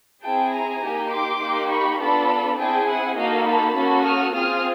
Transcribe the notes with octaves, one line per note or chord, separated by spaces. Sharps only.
C4 E4 G#4 G5 A5
G#5 A#5
A#3 D#4 G4
C6 D6
A#3 D#4 G4
B5 C#6
B3 D4 F4 A4 A5 B5
C4 E4 G#4 G5 A5
F#5 G#5
A#3 D#4 F#4 A4 D#5 F5
A5 B5
A#3 C#4 F#4 A4
D#6 F6
C4 F4 G#4 D#6 F6